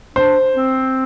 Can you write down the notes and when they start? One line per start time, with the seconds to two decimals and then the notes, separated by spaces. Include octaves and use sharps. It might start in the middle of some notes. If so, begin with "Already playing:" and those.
0.16 D4 C5
0.55 C4